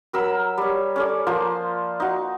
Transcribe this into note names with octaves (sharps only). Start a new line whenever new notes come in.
F#3 A#4 B5 E6
G3 C#5
C#4 A4 D5
F3 A#3 F4 C5
D#4 F#4